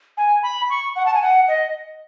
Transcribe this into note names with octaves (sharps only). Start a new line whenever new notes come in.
G#5
B5
C#6
F#5
A5
G#5
F#5
D#5